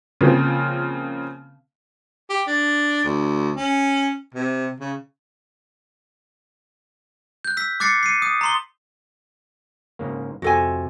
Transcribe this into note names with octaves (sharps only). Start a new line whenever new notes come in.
C#3 F3 A#3 C4 F4
G4
D4
D2
C#4
C3
C#3
F#6 G6
E6 B6
D6 F#6 A6 C7 C#7
C7 C#7 D#7
D#6
A#5 C6 G7
G#2 C#3 A#3
F2 C3 F#4 A4 G#5